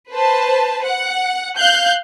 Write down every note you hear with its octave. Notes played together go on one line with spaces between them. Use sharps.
B4 C5 A5
F#5
F5 F#6 G6